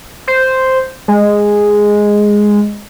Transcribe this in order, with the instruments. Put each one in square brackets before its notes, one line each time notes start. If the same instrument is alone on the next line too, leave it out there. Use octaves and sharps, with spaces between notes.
[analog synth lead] C5
G#3